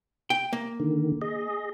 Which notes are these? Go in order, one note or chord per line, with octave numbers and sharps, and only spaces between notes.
G5
A#3
D3 D#3
G#4 D#5